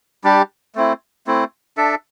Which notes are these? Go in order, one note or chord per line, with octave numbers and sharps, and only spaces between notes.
G3 D4 G4
A3 C4 E4
A3 C4 E4
D4 A4 E5